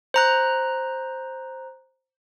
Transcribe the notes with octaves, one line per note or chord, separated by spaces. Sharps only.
C5 A#5 F#6